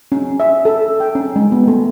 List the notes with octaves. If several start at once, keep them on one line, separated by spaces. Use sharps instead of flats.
C#4
E5
A4
G5
C#4
G#3
B3
A3